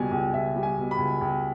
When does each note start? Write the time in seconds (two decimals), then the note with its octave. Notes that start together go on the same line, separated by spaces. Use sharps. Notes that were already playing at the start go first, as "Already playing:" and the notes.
Already playing: C#2 B2 G3 G#5
0.11 C#2
0.33 C#2 E5
0.56 G3
0.63 G#5
0.78 B2
0.91 B5
0.98 C#2
1.21 C#2